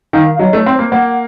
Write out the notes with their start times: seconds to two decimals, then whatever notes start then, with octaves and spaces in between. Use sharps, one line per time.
0.13 D#3 F5
0.35 F5
0.39 F#3 D#5
0.53 A3
0.58 C#5
0.66 C4
0.75 A#3 C5
0.92 A#3 F#5
1.08 F#5